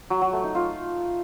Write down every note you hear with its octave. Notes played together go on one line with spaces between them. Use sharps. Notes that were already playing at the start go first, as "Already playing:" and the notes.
F#3
F#3
A3
D#4
F4